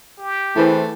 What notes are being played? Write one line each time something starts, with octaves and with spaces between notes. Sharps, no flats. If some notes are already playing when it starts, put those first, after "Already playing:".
G4
E3 A3 C4 E4 G#4 B4